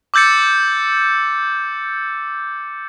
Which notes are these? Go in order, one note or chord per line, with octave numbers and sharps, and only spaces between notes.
D6 E6 G6 A6 C#7